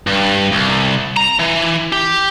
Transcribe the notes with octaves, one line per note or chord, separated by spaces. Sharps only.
G2
C2
A#5
E3
G4